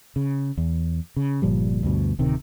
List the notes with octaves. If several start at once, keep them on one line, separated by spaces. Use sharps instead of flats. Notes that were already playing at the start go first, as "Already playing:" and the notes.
C#3
E2
C#3
G1 A#2 F3 G3
D2 G2 B2
D1 C3 D#3